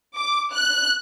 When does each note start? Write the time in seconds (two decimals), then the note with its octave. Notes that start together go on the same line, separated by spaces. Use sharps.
0.15 D6
0.53 F#6